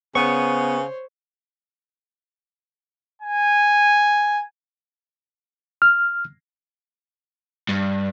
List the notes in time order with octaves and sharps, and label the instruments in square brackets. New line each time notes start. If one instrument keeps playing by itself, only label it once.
[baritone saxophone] C#3 [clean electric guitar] B3 [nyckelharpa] C5 C#5 [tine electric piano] C#6
[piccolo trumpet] G#5
[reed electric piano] F6
[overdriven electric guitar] G2